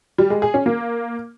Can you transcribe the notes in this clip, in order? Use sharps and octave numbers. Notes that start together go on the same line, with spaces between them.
G3
G#3
G#4
C#4
A#3